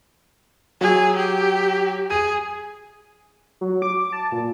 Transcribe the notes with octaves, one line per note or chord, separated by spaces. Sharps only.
F#3 G#4
G4
G#4 D#7
F#3
D6
A5
A#2